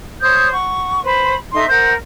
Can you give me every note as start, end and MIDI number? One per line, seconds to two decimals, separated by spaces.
0.21 0.50 72
0.21 0.50 73
0.21 0.50 87
0.21 0.50 91
0.51 1.00 78
0.51 1.00 85
1.03 1.33 71
1.03 1.33 72
1.03 1.33 83
1.53 1.67 63
1.53 1.67 69
1.53 1.67 76
1.53 1.67 84
1.68 1.92 70
1.68 1.92 72
1.68 1.92 78
1.68 1.92 91